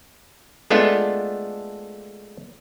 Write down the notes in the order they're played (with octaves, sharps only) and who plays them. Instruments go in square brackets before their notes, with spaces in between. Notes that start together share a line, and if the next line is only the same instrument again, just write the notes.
[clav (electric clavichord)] G#3 A3 B3 D4 F4 A4